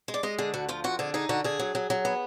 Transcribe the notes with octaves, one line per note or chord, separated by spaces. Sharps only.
G#3
D5
G#3 D#5
D3 G#4
D2 F#4
F3 F4
F2 F#4
D3 G#4
D#4 G#4
D3 F#4
D3 G#4
F#3
F#3
F#3
B3